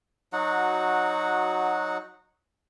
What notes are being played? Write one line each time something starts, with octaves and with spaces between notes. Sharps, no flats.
F#3 D#4 F#4 F#5